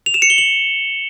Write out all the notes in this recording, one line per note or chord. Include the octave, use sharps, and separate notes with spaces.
F7
E7
C#7
G7
F#7